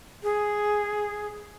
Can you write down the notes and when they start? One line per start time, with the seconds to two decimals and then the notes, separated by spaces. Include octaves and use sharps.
0.23 G#4